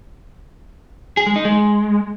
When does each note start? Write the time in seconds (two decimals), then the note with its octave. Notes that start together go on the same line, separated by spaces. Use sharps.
1.17 G#4
1.27 G#3
1.36 D#4
1.45 G#3